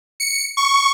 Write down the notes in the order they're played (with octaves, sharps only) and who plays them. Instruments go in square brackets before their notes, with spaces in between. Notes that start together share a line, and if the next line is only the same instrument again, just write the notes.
[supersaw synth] C#7
C#6